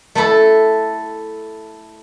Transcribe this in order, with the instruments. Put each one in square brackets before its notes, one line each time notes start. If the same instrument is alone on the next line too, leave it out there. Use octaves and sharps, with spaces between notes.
[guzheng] A3 E4 A4